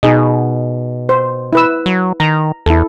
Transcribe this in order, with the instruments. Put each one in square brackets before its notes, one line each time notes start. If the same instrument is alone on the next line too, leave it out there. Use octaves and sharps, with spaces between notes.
[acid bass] B2 [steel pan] D#4 G#4 D#5
[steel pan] C5
E4 B4 E6
[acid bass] F#3
[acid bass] D#3 [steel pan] A#5
[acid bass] E2 [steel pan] E4 A4